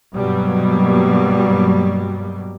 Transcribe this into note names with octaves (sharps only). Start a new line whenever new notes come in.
G2 B2 F#3 G3 A#3